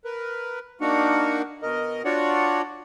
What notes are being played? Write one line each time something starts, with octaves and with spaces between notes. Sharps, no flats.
A#4 B4
A#3 D4 D#4 F#4 A#4 F#5
B2 A#4 D#5
D4 F4 F#4 C#5 D5 F#5